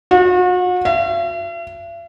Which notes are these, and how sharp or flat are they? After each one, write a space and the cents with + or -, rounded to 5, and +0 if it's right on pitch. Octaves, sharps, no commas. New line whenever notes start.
F#4 -40
E5 +45